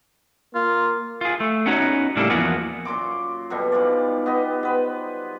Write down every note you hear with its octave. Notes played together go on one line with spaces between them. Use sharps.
A#3 F4
F4 G#4
A3
B3 C#4 D#4 F#4 C#5 A#5
A2 C#3 G3 A#3 D4 A4
E2 F3 A#3 B3 F#4 G#4
F#2 A#2 C6 D6
F#2 B2 D3 G3
G#2 G3 F4 D5
B3 G4 D#5
B3 B4 C5